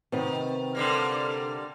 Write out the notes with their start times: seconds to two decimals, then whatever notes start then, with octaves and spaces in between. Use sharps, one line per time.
0.12 C3 D#3 B3 C4
0.75 D3 G3 A#3